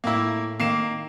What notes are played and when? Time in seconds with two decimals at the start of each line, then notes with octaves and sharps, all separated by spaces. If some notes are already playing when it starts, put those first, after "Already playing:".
0.04 A2 A#3 E4 E7
0.60 D#3 A#3 C7 E7